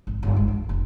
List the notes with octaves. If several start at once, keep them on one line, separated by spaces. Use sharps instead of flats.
G#1
G1
G#2
F2
F1